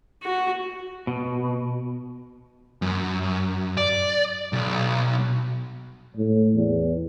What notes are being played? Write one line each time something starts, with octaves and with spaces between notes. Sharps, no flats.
F#4
B2
F#2
D5
B1
A2
E2